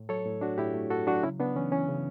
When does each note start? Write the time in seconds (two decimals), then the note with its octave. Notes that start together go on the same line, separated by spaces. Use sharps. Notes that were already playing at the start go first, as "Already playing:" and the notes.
Already playing: A2
0.09 F#3 A4 C#5
0.25 A2
0.41 A3 D4 F#4
0.58 A2 E4 G4
0.74 A3
0.90 A2 F#4 A4
1.07 F#3 D4 F#4
1.23 C#3 C#4 E4
1.39 C#3 B3 D4
1.56 E3 C#4
1.72 E3 C#4
1.88 C#3